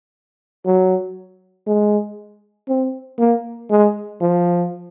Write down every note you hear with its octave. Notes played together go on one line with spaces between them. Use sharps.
F#3
G#3
C4
A#3
G#3
F3